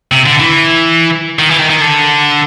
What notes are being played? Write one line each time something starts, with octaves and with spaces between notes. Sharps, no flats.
C3
D3
E3
D#3
E3
D#3
D#3
D3